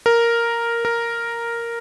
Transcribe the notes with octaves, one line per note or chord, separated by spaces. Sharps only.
A#4
A#4